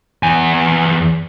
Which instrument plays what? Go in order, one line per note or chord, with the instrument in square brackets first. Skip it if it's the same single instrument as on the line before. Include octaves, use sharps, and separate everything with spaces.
[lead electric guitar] E2 G#5